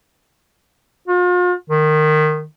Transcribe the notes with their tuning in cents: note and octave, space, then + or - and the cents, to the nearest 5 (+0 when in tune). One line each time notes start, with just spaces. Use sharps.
F4 +40
D#3 -20